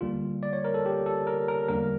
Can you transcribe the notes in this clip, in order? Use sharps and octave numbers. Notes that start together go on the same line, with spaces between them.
D2 D3 G3 A#3 F4
D5
C#5
A#4
A4
G4
A4
A#4
A#4
E2 D3 G3 A#3 A#4